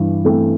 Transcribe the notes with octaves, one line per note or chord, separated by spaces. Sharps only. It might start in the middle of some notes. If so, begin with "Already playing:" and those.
Already playing: G2 E3
E3 A3 C4